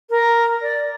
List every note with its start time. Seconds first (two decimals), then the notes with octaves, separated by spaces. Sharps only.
0.10 A#4
0.62 D5